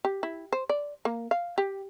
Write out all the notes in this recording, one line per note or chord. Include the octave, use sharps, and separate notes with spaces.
G4
E4
C5
D5
A#3
F5
G4